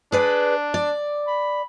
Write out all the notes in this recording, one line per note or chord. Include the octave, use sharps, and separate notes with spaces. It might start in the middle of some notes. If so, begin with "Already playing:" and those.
D4 G#4 B4 D5
D5
B5